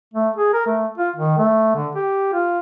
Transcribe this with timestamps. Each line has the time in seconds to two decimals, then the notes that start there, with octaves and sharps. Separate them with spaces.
0.14 A3
0.37 G#4
0.54 A#4
0.67 A3
0.98 F4
1.16 D#3
1.38 A3
1.76 D3
1.96 G4
2.33 F4